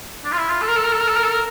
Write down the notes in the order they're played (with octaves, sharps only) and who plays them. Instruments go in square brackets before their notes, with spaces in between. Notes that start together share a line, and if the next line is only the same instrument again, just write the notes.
[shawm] D4
F4
E4
F4
A4
A#4
A4
A#4
A4
A#4
A4
A#4
A4
A#4